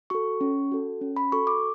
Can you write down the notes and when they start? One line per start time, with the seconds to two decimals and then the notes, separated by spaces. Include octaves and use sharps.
0.10 F#4 A4 C#6
0.41 C#4
0.72 F#4 A4
1.01 C#4
1.16 B5
1.32 F#4 A4 C#6
1.47 D6